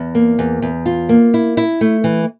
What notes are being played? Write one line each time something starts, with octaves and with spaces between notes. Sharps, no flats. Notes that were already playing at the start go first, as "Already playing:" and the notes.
Already playing: E2
A#3
E2
E2
F4
A#3
E4
E4
A3
E3